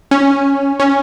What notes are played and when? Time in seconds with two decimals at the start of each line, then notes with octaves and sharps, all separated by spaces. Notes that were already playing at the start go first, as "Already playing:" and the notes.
0.11 C#4
0.80 C#4